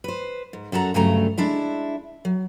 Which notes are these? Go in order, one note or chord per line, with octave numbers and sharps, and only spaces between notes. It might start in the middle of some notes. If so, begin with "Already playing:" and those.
B4 C5
G#2
F#2 F#4 A4 F#5 A#5
D2 G2 C#3 F#3 A3 A#5
G#3 D4 E4 E5
F#3